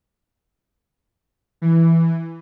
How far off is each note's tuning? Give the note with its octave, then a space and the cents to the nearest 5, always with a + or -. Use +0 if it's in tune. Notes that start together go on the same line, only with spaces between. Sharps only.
E3 +5